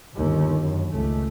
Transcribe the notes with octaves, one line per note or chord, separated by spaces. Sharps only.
G1 D#2
F#2
C#2 A3